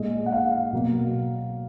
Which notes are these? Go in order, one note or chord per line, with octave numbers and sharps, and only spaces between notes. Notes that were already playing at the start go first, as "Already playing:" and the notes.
Already playing: A#2 G#3 D#5
F#5
F5
B2 F#3 A#3